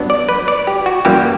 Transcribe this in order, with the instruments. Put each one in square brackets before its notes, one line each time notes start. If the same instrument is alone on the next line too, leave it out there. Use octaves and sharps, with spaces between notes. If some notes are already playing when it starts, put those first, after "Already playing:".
Already playing: [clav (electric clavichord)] G2 F#3 B3 D4
D5
B4
D5
G4
F#4
F#2 E3 G3 A#3 G4